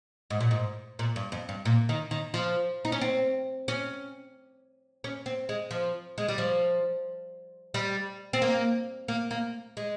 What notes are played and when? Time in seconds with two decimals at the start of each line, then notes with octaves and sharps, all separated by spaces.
0.30 G#2
0.41 A#2
0.51 G#2
0.99 A#2
1.16 G2
1.32 F2
1.49 G2
1.65 A#2
1.89 D#3
2.11 D#3
2.34 F3
2.85 D#4
2.92 C#4
3.01 C4
3.68 C#4
5.04 C#4
5.26 C4
5.49 G#3
5.71 F3
6.18 G#3
6.28 G3
6.38 F3
7.74 G3
8.33 C4
8.42 A#3
9.08 A#3
9.31 A#3
9.77 G#3